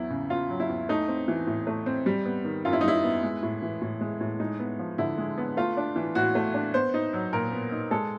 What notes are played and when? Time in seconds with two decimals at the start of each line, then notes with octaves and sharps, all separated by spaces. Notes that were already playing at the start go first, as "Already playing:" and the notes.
Already playing: E2 F#3 E4
0.10 C#3
0.30 E2 F4
0.50 F#3
0.60 E4
0.69 E2
0.89 A3 D#4
1.08 C4
1.28 E3
1.47 A2
1.67 A3
1.86 C4
2.06 G3
2.25 B3
2.45 D#3
2.65 F#2 F4
2.73 E4
2.81 D#4
2.84 G3 E4
3.04 B3
3.23 G#3
3.42 A2
3.62 E3
3.81 A2
4.01 G#3
4.21 A2
4.40 G#3 D#4
4.59 B3
4.79 F3
4.98 D3 E4
5.18 G#3
5.38 B3
5.57 A3 F4
5.77 D4
5.96 E3
6.15 A2 F#4
6.35 A3
6.54 D4
6.74 B3 C5
6.94 D#4
7.13 F#3
7.33 A#2 A#4
7.52 B3
7.72 D#4
7.91 G#3 A4